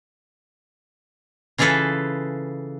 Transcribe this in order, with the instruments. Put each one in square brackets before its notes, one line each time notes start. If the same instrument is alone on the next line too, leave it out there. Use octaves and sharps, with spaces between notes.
[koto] C#3 E3 F4 G#4 A4 B4